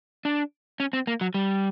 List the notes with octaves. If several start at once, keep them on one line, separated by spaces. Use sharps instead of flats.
D4
C#4
C4
A#3
F#3
G3